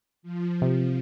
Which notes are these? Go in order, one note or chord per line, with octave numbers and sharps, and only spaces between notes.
F3
C3